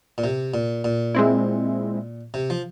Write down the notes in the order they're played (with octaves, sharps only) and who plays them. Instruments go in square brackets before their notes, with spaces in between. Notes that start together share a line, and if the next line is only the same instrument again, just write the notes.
[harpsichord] A#2
C3
A#2
A#2
[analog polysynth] G#3 C4 E4
[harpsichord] C3
F3